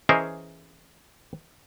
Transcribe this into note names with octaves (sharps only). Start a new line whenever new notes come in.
E3 C#4 G#4 A#4 C5 D#5